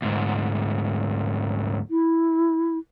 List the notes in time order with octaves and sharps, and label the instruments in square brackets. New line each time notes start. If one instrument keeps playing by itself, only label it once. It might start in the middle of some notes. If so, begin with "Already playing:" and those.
[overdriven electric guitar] D2 G#2
[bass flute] E4